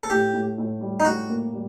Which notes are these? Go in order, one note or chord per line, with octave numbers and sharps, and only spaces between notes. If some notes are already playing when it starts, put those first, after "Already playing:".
A4
A2 G4
A2
A2
G3
D#4
A2 F#4
A#3
G3